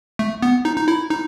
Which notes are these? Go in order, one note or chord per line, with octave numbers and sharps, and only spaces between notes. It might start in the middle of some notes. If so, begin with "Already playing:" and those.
A3
B3
D#4
D#4
E4
D#4